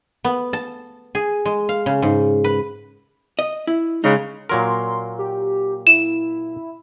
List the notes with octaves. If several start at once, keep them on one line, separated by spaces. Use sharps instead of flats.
B3
A5
G#4
G#3
F5
C#3
G#2
B4
D#5
E4
C#3 G#3 D#4
A#2 F#3 A#4 C6
G4
E4 E7